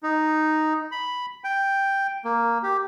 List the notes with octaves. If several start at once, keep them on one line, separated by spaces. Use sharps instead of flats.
D#4
B5
G5
A#3
G4